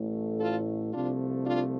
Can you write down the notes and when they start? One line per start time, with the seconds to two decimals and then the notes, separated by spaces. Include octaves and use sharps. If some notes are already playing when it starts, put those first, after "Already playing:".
Already playing: A1 A2 A3
0.40 F4 A4
0.93 C2 C3 F3 A3 D4 F4
1.45 D4 F4